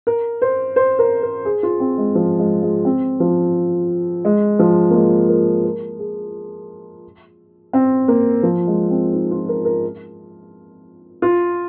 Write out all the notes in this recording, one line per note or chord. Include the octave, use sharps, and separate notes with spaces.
A#4
C5
C5
A#4
A#4
G#4
F4
C4
G#3
F3
G#3
G#3
C4
F3
G#3
F3
A#3
G#3
A#4
A#4
G#4
C4
A#3
F3
G#3
C4
D#4
F4
A#4
A#4
F4